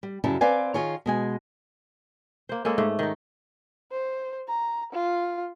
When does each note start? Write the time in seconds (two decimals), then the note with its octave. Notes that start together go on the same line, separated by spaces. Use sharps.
0.03 G3
0.24 F#2 C#3 G3 E4 A5
0.41 C4 B4 D5 F5 G#5
0.74 D#3 F4 G#4 C#5
1.06 B2 G#3 G#5
2.49 A#3 C5
2.65 G#3 A#3 C#4 A4
2.78 G#2 A3
2.99 D#3 D#4
3.91 C5
4.48 A#5
4.92 F4